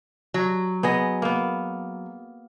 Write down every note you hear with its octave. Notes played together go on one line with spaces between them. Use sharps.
F#3
B3 G#4 D#5
A#3 B3